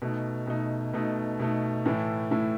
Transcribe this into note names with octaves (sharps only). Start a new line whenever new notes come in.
B2 A3 D#4
B2 A3 D#4
B2 A3 D#4
B2 A3 D#4
A2 E3 A3 E4
A2 E3 A3 E4